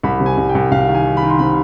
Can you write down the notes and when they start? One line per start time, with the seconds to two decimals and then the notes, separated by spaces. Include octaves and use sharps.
0.03 C2 B5
0.20 C3
0.26 G#5
0.37 C2
0.49 G5
0.55 C2
0.71 C2 F5
0.88 D#3
0.94 G#5
1.06 D#3
1.17 B5
1.22 D#3
1.30 C6
1.39 C3 B5